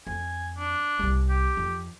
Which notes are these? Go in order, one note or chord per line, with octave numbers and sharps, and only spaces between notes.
F2 G#5
D4
C2 G3
G4
F2